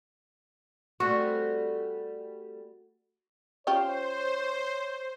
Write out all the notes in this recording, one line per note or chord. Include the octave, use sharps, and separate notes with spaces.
G3 A3 C4 F#4
C#4 F4 G4 C5 C#5